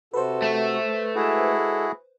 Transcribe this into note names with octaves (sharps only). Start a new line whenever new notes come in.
C3 F#4 A4 B4 C5
A3
G#3 E4 F#4 G#4 A4